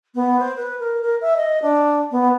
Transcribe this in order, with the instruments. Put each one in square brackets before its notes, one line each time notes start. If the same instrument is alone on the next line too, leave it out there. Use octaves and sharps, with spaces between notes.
[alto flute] B3
C5
B4
A#4
A#4
E5
D#5
D4
B3